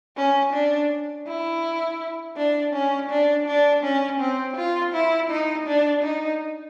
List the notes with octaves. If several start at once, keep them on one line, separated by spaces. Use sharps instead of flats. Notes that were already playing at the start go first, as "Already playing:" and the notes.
C#4
D4
E4
D4
C#4
D4
D4
C#4
C4
F4
E4
D#4
D4
D#4